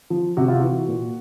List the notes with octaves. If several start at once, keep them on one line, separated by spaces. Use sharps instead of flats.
F3
C3 F#4
F4
E3 F#4
A#2